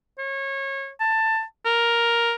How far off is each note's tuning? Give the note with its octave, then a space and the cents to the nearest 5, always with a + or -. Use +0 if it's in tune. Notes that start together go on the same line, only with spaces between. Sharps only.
C#5 -25
A5 +15
A#4 +5